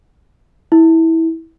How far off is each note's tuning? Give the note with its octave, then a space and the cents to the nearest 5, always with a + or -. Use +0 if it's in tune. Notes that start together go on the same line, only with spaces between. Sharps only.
E4 -20